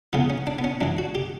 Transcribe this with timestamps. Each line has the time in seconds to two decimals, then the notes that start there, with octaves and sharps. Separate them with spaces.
0.13 E2 C#3 E3 B3
0.30 C#4
0.47 D4
0.59 B3
0.64 C#4
0.81 F#2 E3 D4
0.98 F#4
1.15 G4